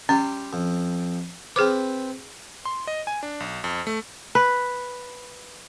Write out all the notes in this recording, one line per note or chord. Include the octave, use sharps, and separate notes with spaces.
G3 C#4 G5 C6
F2
C4 G#4 B4 C5 D6
C6
D#5
G#5
D4
B1
F2
A3
B4